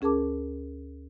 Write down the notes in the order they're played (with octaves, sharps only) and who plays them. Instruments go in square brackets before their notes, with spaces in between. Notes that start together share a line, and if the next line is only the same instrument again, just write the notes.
[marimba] D2 C#4 G#4 A#4 A5 D6